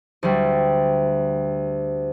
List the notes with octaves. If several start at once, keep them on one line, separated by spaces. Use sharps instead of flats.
D2 G3